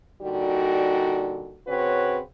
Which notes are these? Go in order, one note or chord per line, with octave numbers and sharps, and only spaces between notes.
A#2 D3 G3 D#4 F#4
C#3 C4 F#4 B4 C#5